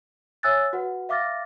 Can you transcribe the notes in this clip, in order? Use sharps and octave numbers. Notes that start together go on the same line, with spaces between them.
C#5 E5 G#5 E6 F#6 A6
F#4 B4 F#5
E5 F5 D6 F6 A6 A#6